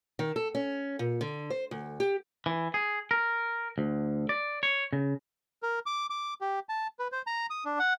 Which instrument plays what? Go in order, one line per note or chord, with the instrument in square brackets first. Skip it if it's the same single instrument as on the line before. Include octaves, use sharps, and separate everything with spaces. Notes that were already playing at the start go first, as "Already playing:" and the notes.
[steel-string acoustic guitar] D#3
A4
C#4
A#2
D3
C5
D2
G4
[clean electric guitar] E3
G#4
A#4
D2
D5
C#5
C#3
[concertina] A#4
D6
D6
G4
A5
B4
C5
A#5
D#6
D4
F#5